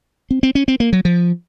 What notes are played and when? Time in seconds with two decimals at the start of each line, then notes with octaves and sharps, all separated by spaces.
0.31 C4
0.43 C4
0.55 C#4
0.68 C4
0.80 A#3
0.93 F#3
1.05 F3